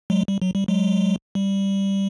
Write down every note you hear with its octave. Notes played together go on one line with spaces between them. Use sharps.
F#3 G#3
G3
F#3
G3
F#3 G#3
G3